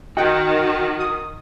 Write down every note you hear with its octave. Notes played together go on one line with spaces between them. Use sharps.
D#3 F#4 D#5 F#5 G5
D#6